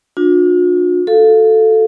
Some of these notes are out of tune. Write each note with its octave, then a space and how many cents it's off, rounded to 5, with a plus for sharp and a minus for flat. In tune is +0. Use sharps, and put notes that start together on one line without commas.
D4 +10 F4 +45
F#4 +0 A4 +0 F5 +0